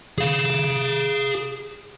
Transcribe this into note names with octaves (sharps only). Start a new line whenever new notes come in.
G#4 F5